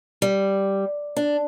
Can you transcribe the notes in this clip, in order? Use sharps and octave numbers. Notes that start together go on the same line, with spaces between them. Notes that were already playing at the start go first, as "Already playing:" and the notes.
G3
D4